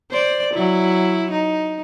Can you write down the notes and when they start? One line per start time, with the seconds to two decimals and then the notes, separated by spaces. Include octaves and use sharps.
0.11 C5 D5
0.54 F#3 E4
1.31 D#4